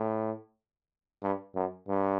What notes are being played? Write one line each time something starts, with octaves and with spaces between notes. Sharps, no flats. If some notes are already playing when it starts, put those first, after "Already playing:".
Already playing: A2
G2
F#2
G2